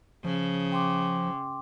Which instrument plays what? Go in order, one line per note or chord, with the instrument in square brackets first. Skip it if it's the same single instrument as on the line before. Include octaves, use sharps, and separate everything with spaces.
[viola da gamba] C#3 [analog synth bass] F3
[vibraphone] G5 C6 D6